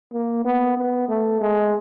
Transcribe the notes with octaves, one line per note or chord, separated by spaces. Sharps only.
A#3
B3
B3
A3
G#3